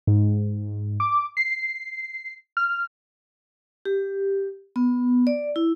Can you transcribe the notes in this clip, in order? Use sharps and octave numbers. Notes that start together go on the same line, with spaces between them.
G#2
D6
C7
F6
G4
B3
D5
E4